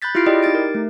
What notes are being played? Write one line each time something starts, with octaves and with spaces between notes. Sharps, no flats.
B5 F#6 G6 A6 B6
E4 F4 G4 F6 C7 D7
E4 G4 G#4 D5 D#5 G5
D#4 G4 A6 D7
A#4
A3